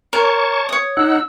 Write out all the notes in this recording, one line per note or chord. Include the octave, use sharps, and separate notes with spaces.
A#4 C#5 A5 C#6
C#5 D#6
D#4 F#5 E6